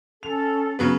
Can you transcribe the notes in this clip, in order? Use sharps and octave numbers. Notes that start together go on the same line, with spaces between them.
C#4 A4 F7
C#3 F#3 B3